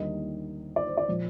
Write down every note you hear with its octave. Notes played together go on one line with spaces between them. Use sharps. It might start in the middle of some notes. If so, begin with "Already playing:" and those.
Already playing: D#2 D3 G3 A#3 D#4 D#5
D5
C5
D5
A#2 F3